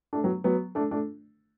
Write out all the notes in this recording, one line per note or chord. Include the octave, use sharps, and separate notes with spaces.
A3 D4
F#3 B3
F#3 B3
A3 D4
A3 D4